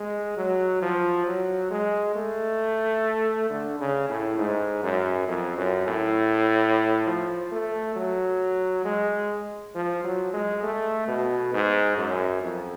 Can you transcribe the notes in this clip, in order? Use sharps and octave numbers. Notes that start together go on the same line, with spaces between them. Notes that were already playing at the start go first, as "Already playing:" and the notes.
Already playing: G#3
F#3
F3
F#3
G#3
A3
D3
C#3
A2
G#2
F#2
F2
F#2
A2
F3
A3
F#3
G#3
F3
F#3
G#3
A3
B2
G#2
F#2
F2